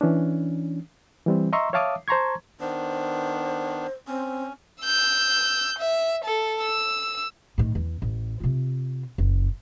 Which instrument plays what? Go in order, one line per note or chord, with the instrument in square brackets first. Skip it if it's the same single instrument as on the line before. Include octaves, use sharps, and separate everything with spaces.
[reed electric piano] E3 C#4 D4
E3 G3 C4
D#5 E5 A#5 C6 C#6 E6
C#5 E5 F5 A5 D6 D#6
C5 A5 A#5 C6 C#6 G#6
[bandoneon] D#3 B3 D4 [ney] C5
[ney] C4 [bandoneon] C#4
[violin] E6 G6
E5
A4
E6
[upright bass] A2 D#3
E2
A1
C3 F4
F#1